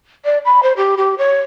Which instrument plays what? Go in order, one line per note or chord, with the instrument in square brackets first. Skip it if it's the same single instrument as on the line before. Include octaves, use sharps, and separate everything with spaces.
[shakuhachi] D5
B5
C5
G4
G4
C#5